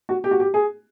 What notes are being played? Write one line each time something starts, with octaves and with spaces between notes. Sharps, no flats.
F#4
G4
F#4
G4
G#4